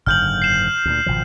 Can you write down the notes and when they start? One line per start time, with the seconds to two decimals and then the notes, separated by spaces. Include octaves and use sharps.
0.06 F#1 G#2 D3 F6 G6 F#7
0.42 C7 E7
0.85 D2 A#2
1.06 G#1 B2 F3